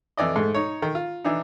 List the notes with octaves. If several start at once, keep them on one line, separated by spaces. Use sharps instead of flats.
F2 E3 D5 D#5
G#2 A3
D#4 C#5
D#3
F4
E3 D4 D#4